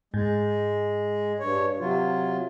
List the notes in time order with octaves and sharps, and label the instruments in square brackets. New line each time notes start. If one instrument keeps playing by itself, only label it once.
[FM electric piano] G#2 [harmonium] G#3
[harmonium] G2 C#5
C3 F#3 F4